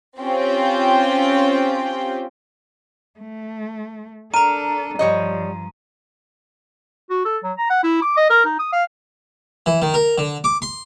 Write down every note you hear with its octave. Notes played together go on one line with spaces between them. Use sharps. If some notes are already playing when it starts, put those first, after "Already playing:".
C4 C#4 F4 G4 G5
A3
D4 A4 A#4 A#5 D#7
G2 F3 G3 C#5 D#5
F#4
A4
F#3
A#5
F#5
E4
D6
D#5
A#4
D#4
D#6
F5
E3
D#3
A#4
D3
D6
C6